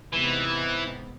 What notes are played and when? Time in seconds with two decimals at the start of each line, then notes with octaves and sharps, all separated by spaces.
0.13 G#2 C3 E3 B3